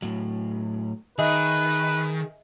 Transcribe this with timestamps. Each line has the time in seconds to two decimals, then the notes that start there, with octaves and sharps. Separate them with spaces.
0.02 A2 F#3
1.19 D#3 G#4 B4 D#5 E5